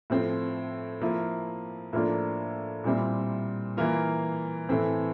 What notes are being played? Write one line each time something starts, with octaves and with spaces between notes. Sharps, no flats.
A2 F3 C4
F3 A#3 E4
A2 F3 A#3 D4 F4
A#2 G3 C4 E4
E3 A#3 F4
A2 E3 A3 C4